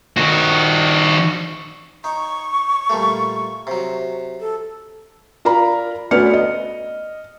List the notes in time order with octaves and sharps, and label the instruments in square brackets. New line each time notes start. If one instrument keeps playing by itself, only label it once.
[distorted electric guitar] D#3 F#4
[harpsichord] D#4 [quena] C#6
[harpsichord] A#2 G3 A3
C3 F#3
[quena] A4
[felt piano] F4 A#4 D5 A#5 B5
D2 B3 C#4 D5 F6 C#7
D#5